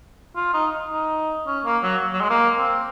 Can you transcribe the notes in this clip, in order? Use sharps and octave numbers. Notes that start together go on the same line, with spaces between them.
F4
D#4
D#4
C#4
A#3
F#3
F#3
G#3
A#3
C4